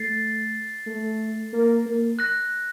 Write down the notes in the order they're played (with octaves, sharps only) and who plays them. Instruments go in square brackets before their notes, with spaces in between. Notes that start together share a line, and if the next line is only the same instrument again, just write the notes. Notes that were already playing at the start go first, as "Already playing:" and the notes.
Already playing: [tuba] A3 [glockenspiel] A6 C7
[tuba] A3
A#3
A#3
[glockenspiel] F#6 A#6